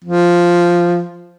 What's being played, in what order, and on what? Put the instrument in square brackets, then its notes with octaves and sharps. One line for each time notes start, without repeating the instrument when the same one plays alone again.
[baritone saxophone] F3